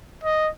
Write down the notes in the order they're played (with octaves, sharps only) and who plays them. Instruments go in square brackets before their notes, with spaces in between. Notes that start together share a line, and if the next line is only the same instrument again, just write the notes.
[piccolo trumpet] D#5